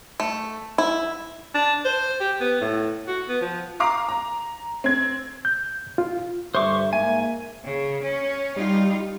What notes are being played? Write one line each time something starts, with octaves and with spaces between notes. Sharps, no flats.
A3
E4
D4
C5
G4
B3
A2
F#4
B3
F3
F5 A#5 D6
A#5
C4 G#6
G6
F4
G2 D3 G3 C5 E5 C#6 D6
G#2 A#3 E5 G#5
C#3
C#4
G3 D#4 F4